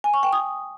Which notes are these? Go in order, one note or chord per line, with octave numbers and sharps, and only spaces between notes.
G#5
C#6
G5
D#6